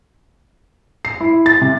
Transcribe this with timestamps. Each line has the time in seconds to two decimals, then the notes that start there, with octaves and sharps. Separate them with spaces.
1.05 C7
1.21 E4
1.46 A6
1.61 C3